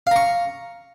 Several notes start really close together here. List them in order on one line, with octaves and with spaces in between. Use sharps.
F5 A#5 C#6